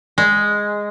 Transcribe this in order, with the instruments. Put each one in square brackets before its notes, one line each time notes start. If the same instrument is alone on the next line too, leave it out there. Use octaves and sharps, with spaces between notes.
[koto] G#3